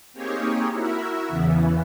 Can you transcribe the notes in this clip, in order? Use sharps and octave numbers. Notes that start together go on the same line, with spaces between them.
A#3 C4 D#4 G4 G#4 C#5
E4 F#4 A#4 E5
E2 C#3 E3 B3